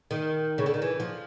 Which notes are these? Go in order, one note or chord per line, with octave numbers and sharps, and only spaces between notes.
D#3
C#3
D3
D#3
E3
F3